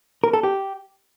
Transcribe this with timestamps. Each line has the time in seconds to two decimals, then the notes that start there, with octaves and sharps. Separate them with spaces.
0.24 A#4
0.33 A4
0.43 G4